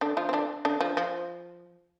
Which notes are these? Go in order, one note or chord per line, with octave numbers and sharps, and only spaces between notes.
D3 D4
F3 F4
C4
D3 D4
D3 D4
F3
F3